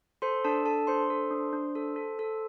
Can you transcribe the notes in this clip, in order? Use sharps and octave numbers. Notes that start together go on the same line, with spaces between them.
A4 C5 C6
D4 A4 A5
A4 A5
D4 C5 C6
A4
D4
D4
A4
A4
A4